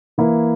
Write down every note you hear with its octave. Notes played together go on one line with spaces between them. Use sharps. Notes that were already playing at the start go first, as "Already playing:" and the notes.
E3 A#3 E4